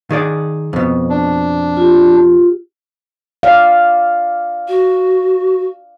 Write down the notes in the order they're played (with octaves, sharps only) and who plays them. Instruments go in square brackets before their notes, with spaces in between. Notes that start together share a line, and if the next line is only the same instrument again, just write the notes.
[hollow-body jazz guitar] D#3 G#4 D5
F2 B2
[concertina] D4
[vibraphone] F4 G4
[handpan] D5 F5
[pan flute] F#4